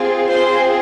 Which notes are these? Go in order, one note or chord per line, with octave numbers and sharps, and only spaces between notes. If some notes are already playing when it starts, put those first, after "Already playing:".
Already playing: C4 F4 G#4
C4 F4 G#4 C5 C6